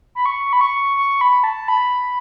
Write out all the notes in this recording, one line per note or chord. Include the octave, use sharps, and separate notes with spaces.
B5
C#6
B5
C#6
C#6
B5
A5
B5